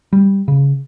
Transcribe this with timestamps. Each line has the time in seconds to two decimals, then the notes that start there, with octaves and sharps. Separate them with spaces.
0.13 G3
0.48 C#3